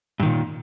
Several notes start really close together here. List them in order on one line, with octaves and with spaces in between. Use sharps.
G2 D#3 A#2